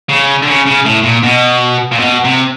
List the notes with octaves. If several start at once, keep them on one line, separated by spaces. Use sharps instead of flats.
C#3
D3
C#3
C#3
A2
A#2
B2
A#2
B2
C3